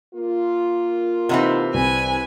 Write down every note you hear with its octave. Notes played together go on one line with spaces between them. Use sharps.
A#3 F4
C3 E3 C4 D#4 F#5
C2 B4 G#5